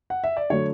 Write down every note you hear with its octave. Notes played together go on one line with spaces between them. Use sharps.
F#5
E5
D5
D3 F#3 A3 C#5